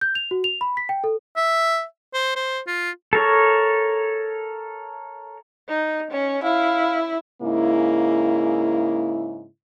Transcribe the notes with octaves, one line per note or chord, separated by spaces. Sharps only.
G6
F7
F#4
F7
B5
B6
G5
A4
E5
C5
C5
F4
A4 A#4 C#5
D#4
C#4
E4 F5
G#2 C#3 A#3 E4